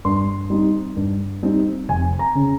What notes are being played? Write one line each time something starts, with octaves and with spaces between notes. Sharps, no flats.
G2 C6
G3 C4 D#4
G2
G3 C4 D#4
F1 G#5
A#5
C#3